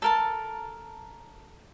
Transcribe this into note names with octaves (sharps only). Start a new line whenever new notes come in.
A4 A#4 A5